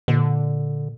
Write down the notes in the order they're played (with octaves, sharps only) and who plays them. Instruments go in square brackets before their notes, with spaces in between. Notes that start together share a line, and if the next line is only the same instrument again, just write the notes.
[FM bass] A#2 [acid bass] D3